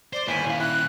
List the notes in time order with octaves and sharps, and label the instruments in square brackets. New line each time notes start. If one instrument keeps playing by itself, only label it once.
[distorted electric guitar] C5 [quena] D5
[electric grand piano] G1 D#2 B6 [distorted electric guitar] E4 [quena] G#5
[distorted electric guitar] A#2 D#3 [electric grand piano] E4 F5
[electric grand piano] E4 [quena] F#6